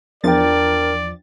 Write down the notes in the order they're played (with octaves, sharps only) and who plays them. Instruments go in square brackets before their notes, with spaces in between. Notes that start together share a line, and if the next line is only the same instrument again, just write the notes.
[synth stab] E2 F3 A6 [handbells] D4 G5 [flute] A#4 [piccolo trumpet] D5